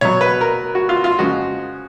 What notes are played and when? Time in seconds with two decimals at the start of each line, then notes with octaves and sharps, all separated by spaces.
0.01 B2 F#3 C#5
0.21 B4
0.41 A#4
0.75 F#4
0.89 F4
1.04 F4
1.19 C#3 F3 G#3 F#4